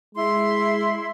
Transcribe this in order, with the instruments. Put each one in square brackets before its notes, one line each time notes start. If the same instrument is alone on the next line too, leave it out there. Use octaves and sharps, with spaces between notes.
[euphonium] G#3 [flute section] E4 C6